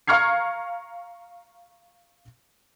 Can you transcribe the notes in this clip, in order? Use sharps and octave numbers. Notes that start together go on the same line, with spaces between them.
F5 A#5 C#6 F6 G#6 C7